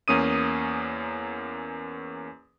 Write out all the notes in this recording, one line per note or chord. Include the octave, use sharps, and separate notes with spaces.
E2 A#3 C#4 D#6 D#7